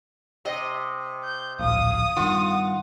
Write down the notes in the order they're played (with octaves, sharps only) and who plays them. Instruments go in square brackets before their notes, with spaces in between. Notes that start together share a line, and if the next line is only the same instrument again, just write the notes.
[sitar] C3 D#5
[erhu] G6
[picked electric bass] D1 A#1 [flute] F5 [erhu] D#6
[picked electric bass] G2 D#3 [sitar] F4 [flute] F#5